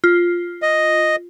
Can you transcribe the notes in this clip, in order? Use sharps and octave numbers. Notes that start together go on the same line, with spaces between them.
F4
D#5